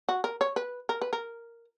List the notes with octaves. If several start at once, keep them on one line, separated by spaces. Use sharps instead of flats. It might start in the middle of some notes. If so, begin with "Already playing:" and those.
F#4
A#4
C#5
B4
A#4
B4
A#4